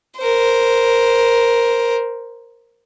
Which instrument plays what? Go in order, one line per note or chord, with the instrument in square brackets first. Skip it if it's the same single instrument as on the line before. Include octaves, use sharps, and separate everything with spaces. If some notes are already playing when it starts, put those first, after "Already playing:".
[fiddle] A#4 C5